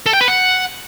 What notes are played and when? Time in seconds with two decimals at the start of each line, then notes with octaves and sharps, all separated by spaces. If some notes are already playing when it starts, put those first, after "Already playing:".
0.06 A4
0.13 G5
0.21 B4
0.28 F#5